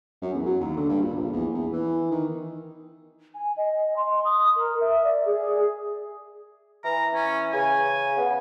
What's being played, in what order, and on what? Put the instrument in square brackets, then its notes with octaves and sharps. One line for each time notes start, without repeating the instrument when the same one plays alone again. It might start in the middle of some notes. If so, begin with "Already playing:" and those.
[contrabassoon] F#2
E2
F#3
D#2
D3
G2
A#2
A#1
E2
E2
E3
D#3
[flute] G#5
D#5
C6
D#6
A#4
E5
D5
G#4
[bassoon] E3 [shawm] A#5
[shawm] C#4
[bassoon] C#3 [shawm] G#5
[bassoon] B3